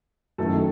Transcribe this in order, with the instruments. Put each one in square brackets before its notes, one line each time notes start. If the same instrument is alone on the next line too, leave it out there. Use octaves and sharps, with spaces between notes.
[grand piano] F#2 D#3 F#3 A3 E4 [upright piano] A4